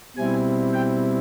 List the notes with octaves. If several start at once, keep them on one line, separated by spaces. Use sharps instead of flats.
B2 G3 C4 E4 G#5
G5